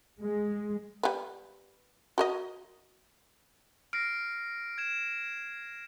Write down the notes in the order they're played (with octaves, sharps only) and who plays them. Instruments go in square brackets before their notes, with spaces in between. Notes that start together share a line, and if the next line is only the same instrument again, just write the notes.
[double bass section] G#3
[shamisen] G3 B3
F#4 A#4 D#5
[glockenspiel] F6 [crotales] A#6 C7 D7
[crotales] G#6 E7